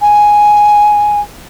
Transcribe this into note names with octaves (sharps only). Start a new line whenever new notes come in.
G#5